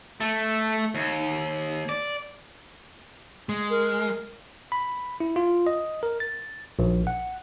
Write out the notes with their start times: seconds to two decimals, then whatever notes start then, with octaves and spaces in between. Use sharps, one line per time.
0.20 A3
0.95 D#2
1.89 D5
3.49 G#3
3.70 A#4
4.72 B5
5.20 E4
5.36 F4
5.67 D#5
6.03 A#4
6.20 A6
6.79 A#1
7.07 F#5